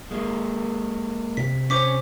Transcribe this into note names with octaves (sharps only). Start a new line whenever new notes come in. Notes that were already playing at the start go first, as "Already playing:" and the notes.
G#3 A#3
C3 B6
C#4 C5 C#5 D6 B6